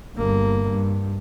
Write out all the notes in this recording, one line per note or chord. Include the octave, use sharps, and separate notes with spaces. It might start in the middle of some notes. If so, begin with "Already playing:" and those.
G1 A#3
G2